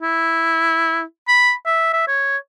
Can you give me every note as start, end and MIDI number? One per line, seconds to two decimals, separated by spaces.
0.02 1.02 64
1.28 1.52 83
1.65 1.91 76
1.93 2.05 76
2.07 2.37 73